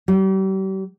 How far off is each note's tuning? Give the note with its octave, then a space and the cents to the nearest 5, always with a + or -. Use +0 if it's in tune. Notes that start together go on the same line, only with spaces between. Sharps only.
G3 -40